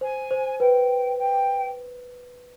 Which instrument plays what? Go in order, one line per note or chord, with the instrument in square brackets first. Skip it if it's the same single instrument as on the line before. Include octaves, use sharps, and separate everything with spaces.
[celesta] C5 [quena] G#5
[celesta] C5
[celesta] B4 [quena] G5
[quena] G5